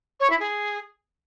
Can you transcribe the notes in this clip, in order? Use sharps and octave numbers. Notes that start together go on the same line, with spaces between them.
C#5
E4
G#4